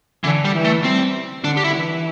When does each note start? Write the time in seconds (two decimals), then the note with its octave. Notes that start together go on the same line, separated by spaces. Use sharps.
0.24 D3 E3
0.45 G3
0.54 E3
0.65 A3
0.83 G3 C4
1.44 D3 D4
1.57 G4
1.64 E4
1.74 E3